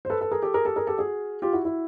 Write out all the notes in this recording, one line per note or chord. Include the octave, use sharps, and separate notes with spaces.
C5
A4 B4
A4 B4
G#4 A#4
G4 A4
G#4 A#4
G4 A4
G#4 A#4
G4 A4
F#4 G#4
F4 G4
E4 F#4
E4 F#4